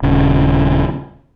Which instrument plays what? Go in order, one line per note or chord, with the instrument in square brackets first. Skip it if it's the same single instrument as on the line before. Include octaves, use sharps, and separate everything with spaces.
[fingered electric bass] D#1 C#3